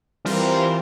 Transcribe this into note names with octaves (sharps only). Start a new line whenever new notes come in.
E3 G3 C4 F4 A#4 C5